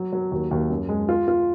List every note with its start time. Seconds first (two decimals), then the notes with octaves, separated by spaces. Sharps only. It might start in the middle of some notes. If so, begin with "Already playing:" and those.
Already playing: F#3
0.13 F#3
0.32 D#2
0.51 D#2
0.70 F#2
0.89 G#3
1.09 F4
1.28 F4